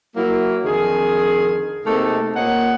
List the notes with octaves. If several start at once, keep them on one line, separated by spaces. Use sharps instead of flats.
F#3 A#3 E4
F2 D3 D#3 G#4
C3 A3 A#3 D#4 G#4 A4
A#2 A#3 C#4 D#5 F#5